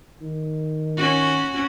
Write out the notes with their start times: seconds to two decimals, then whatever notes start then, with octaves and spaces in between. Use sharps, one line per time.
0.22 D#3
0.97 C#4 F#4